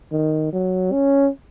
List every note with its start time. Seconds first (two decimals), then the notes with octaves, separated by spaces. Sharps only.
0.12 D#3
0.53 F#3
0.92 C#4